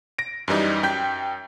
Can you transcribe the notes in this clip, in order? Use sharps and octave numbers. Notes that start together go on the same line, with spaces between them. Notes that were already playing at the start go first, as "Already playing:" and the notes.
A#6 D7
F#2 E3 G3 D#4
F#2 G5 G6 B6